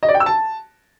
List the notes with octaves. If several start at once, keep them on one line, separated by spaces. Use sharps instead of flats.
D#5
D5
G5
E6
A5